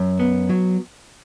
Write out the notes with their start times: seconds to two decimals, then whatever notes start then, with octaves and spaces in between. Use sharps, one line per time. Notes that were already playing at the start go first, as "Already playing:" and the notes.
Already playing: F#2
0.19 B3
0.49 F#3